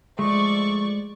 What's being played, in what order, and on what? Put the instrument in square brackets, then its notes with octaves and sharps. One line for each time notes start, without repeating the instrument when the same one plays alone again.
[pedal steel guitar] F3 A3 [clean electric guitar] G#3 [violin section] D5 C#6